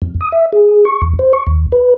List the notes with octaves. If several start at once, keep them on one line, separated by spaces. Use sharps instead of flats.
F2
D#6
E5
G#4
C#6
E2
C5
C#6
D#2
B4